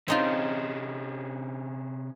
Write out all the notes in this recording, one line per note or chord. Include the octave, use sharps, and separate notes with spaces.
C3 C4 C#4 D#4 F4